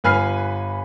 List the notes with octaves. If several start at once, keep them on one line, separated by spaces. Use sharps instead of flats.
G1 B4 G#5 F6 C7